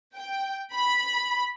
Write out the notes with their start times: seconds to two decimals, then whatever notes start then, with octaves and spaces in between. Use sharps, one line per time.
0.16 G5
0.74 B5